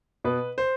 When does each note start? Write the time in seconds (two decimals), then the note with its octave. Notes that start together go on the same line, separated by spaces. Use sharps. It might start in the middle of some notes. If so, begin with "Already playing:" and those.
0.24 B2 B4
0.58 C5